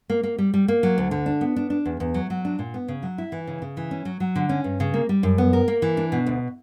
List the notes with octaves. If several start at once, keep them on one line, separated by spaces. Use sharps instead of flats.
A#3
A#3
G3
G3
A#3
F#3
D2
D3
D4
B3
D4
D4
E2
E2
F#3
F#3
D4
A#2
B3
C#3
F#3
E4
E3
C#3
C#3
E3
C#4
F#3
F#3
D3
C#4
G2
C#3
A#3
G3
F#2
B3
A#4
A#3
E3
D4
B2
D2